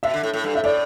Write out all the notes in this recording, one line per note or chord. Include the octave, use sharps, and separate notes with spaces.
B2 E5
D3
A2
A2
G2
A2 E5
A2 D5